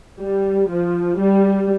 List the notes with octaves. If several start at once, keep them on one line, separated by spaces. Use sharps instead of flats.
G3
F3
G3